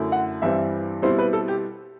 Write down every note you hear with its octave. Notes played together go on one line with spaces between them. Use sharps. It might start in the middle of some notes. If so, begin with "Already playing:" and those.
Already playing: F#2 D3 A3 E4
F#5
G2 E3 G3 C4 E5
B2 G3 C4 E4 C5
B4
A4
G4